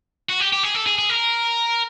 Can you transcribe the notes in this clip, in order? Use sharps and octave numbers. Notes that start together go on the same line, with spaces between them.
F#4
G4
G4
G#4
A4
G#4
G#4
A#4